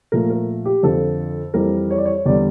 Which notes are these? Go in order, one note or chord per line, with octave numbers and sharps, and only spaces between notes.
A#2 F3 A3 A#4
A#4
G4
F2 D3 F3 A4
F2 E3 G3 A#4
C#5
D5
C#5
E2 D3 G3 D5